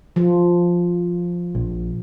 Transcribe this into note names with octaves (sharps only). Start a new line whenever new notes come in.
F3
A#1